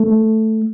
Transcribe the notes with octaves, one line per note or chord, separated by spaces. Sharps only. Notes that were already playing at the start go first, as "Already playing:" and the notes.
Already playing: A3